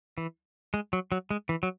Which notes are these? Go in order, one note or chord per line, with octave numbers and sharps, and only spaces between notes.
E3
G#3
F#3
F#3
G#3
E3
F#3